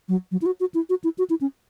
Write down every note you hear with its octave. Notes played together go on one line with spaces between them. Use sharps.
F#3
F#3
E4
F#4
F#4
E4
F#4
E4
F#4
E4
C#4